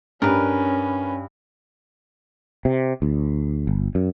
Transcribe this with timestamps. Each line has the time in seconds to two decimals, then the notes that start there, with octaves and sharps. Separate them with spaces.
0.22 G2 C#4 A#4 B4
2.65 C3
3.02 D2
3.67 G1
3.95 F#2